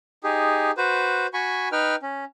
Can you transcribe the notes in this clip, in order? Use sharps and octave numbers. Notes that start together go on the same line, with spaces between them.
D#4 G4 G#4
F#4 B4 C5
F#4 G#5 B5 C#6
D#4 B4 G5 F6
C#4